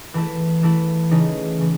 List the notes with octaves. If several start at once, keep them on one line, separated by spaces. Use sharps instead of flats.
E3 A3 E4
E3 A3 E4
C#3 E3 A3 D#4
C#3 E3